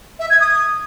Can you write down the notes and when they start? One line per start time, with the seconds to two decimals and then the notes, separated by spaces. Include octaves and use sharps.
0.19 E5
0.30 G#6
0.40 D#6